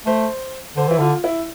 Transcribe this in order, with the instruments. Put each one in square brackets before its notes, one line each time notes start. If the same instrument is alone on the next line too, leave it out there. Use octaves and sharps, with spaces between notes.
[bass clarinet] A3 [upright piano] C5
[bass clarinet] D3 [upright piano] C5
[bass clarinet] E3 [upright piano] E4
[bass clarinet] D3 [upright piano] F4
[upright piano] E4